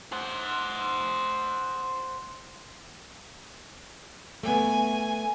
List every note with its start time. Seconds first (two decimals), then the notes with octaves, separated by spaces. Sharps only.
0.13 C5 F#5
4.43 A3 B3 G#5